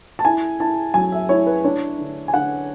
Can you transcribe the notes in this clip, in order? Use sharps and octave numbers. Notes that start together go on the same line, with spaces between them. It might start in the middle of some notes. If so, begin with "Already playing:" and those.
A5
E4 G#5
E4 A5
F#3 G#5
E5
E4 C#5
B4
D4 C#5
D3
G#5
D3 F#5